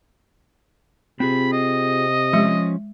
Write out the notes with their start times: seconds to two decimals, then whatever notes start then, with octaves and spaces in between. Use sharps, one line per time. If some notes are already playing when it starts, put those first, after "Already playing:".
1.20 C3 C4 F4 G#4 B5
1.52 D#5
2.33 F3 G#3 C#4